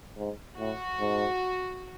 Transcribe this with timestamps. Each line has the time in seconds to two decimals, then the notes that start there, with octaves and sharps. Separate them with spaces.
0.17 G#2
0.58 A2 F#4
1.00 G#2